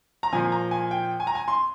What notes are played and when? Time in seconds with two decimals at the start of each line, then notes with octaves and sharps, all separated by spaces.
0.23 A#5
0.33 A#2 F3 G#5
0.52 A#5
0.71 G#5
0.91 G5
1.20 G#5
1.27 A#5
1.35 G#5
1.48 C6